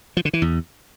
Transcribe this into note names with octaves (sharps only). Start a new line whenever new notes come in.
F3
D3
E3
E2